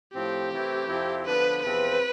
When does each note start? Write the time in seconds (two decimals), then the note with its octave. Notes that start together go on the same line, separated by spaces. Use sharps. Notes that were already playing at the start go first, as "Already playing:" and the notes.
0.14 A2 F3 C4 G4
0.51 C3 E3 A3 C4 E4
0.88 F2 C3 F3 C4 E4
1.25 D3 F3 B3 D4 B4
1.62 E2 C3 F3 C4 B4